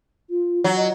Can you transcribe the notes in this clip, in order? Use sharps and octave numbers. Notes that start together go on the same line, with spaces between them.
F4
F#3
D#5